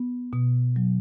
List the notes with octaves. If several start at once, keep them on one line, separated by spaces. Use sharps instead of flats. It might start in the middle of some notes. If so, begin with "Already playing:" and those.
Already playing: B3
B2
F#3